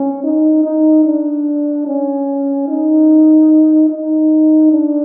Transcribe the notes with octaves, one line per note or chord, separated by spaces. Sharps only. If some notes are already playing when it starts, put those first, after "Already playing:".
Already playing: C#4
D#4
D#4
D4
C#4
D#4
D#4
D4